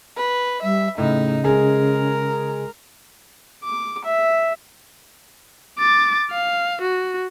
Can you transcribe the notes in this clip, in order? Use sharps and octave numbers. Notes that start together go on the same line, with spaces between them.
B4
G3 E5
A2 C#3 D#4
G#3 G#4 A#4
D6
E5
D6 A6
F5
F#4